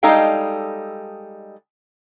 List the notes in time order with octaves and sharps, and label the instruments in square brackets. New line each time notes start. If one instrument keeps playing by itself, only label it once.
[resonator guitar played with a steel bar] G3 G#3 D#4 A4 F5 G5